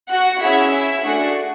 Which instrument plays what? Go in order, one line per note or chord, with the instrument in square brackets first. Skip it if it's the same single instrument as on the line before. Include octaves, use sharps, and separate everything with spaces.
[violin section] F#4 F#5
C#4 E4 G#4 E5
E4 E5
A3 D4 F#4 G#4 F#5